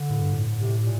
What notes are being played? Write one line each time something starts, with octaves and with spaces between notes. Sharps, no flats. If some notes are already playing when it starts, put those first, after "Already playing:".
Already playing: D3
A2
G2
A2
C3
A#2